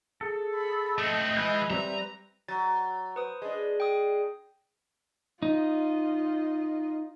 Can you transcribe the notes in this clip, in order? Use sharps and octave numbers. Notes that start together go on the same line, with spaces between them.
G#4 A4
B5
A3 C4 D#5
E3 G#3 B5 G6
G3 C4 B4 E5 A#5
F#3 A6
B4 C5 D#6
G#3 D4
G5 D#6
D#4 F4 D#5